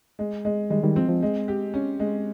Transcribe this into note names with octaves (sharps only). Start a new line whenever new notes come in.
G#3
G#3
D#3 G3 G#3
D#3 G3
F3 C4
F3
G#3
G4
C#4
G#3